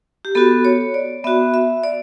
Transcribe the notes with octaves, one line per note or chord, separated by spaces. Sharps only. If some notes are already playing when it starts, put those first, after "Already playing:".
G4
B3 F#4 A4
C#5
D5
B3 F#4 E5
E5
D5